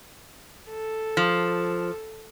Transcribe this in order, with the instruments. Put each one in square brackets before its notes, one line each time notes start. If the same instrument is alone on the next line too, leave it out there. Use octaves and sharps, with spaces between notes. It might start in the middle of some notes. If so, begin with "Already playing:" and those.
[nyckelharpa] A4
[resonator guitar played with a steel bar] F3